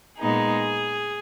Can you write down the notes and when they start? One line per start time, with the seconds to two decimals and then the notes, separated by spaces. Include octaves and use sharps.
0.19 A#2 G#3 B3 D#4 G#4